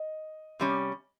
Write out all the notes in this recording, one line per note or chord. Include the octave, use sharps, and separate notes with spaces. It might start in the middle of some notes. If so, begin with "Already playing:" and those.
Already playing: D#5
C3 G3 C#4